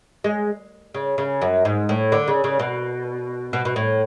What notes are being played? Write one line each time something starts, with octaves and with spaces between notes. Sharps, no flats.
G#3
C#3
C#3
F#2
G#2
A2
D3
C#3
C#3
B2
B2
B2
A2